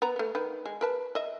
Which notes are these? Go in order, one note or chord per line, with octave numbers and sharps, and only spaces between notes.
B3 B4 A#5
A3 B3
D#3 B4
G#3
A#4 B4 A5
D#5 E5